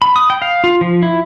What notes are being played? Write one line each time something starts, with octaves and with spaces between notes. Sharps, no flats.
B5
D#6
G5
F5
F4
F3
E4